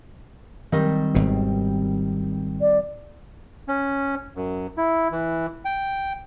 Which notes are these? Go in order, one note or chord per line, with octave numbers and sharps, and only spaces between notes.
D#3 G3 C4 D#5
G#1 B2
D5
C#4
F#2
E4
E3
G5